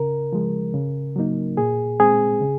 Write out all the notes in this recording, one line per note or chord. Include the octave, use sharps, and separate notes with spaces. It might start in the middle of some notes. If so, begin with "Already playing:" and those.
Already playing: C#3 A#4
F3 G#3
C#3
F#3 A#3 D#4
A#2 G#4
G#3 C4 G#4
C#3